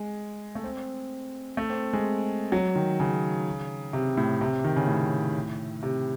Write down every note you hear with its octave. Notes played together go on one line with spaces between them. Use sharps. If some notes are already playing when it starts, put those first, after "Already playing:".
Already playing: G#3
A3
C4
A3
C4
G#3
F#3
D#3
C#3
C3
A2
C3
D#3
C#3
A2
C3